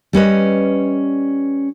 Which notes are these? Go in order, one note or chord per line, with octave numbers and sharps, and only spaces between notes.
G3 C#4 B4 D#5